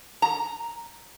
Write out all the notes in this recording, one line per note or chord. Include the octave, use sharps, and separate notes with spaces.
A#5